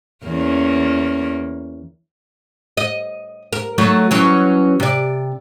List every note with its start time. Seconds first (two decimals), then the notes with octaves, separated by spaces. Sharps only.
0.25 E2 A#3 C#4
2.77 D#5
3.53 A#4
3.78 F#3 A3 D#4
4.11 E3 F#3 C#4
4.80 C3 D5